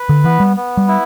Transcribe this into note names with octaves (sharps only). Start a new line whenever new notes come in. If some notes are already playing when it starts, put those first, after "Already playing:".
Already playing: B4
D3
E3 B3
G3
B3
G3
E4